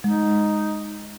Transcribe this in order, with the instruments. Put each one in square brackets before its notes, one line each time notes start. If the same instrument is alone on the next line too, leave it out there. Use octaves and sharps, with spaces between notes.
[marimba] G#3 [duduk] D#4